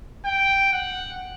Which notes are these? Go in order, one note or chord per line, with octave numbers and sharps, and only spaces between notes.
G5
F#5